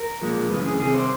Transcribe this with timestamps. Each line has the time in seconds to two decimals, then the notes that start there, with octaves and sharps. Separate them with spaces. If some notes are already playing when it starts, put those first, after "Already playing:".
Already playing: A#4
0.21 B1 A#2 F3 G#3
0.50 F#2 C#3 E3 A3 B4
0.66 G#4
0.80 C2 C3 D#3 G#4
0.94 C5